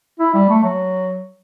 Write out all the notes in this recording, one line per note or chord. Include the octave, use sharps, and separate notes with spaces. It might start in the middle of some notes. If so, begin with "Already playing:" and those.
E4
G3
A3
F#3